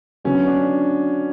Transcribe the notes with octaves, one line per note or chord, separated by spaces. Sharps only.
D3 F#3 B3 C#4
D4